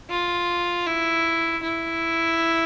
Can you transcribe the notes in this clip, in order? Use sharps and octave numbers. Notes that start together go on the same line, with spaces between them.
F4
E4
E4